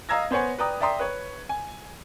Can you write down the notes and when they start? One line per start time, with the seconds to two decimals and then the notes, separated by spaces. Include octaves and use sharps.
0.09 D#5 F5 A#5 E6 G#6 A#6
0.31 B3 C5 C#5 F#5 G#5
0.58 B4 D5 G5 A#5 D#6
0.81 D5 E5 G5 A#5 C6 D#6
0.99 B4 C#5
1.49 G#5